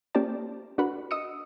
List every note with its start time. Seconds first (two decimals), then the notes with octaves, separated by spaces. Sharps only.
0.15 A#3 C#4 G4 C5 D5 A5
0.78 D4 F#4 A#4 B4 F#5 B5
1.11 D#5 D#6 E6 C#7